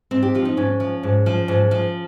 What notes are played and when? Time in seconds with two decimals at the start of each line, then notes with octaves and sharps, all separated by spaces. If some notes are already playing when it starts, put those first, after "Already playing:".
0.11 G#2 C4
0.22 G4
0.35 F3 F4
0.45 D#4
0.57 G#2 C#4
0.80 F3
1.03 G#2
1.26 F3
1.48 G#2
1.71 F3